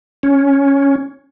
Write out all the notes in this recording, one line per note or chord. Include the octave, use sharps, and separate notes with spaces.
C#4